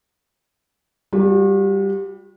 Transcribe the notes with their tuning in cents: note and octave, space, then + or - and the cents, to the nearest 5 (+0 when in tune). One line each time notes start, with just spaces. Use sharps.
G3 +0 F#4 -45